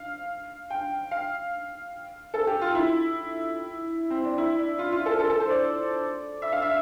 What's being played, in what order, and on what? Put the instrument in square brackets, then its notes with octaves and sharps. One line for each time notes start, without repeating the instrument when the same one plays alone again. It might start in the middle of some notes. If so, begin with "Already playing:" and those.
Already playing: [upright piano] F5
G5
F5
A4
G4
F4
E4
C4
D4
E4
D4
F4
F4
A4
A4
A4
C5
D5
E5
F5
E5